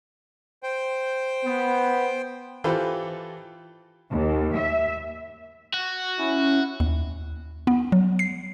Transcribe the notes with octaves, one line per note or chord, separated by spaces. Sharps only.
C5 G5
B3
E3 F4 G4 A4 B4 C5
D#2
E5
F#4
C#4 E4
D#2
B3
F#3
C7